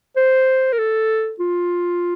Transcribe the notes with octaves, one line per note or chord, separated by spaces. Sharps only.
C5
A#4
A4
F4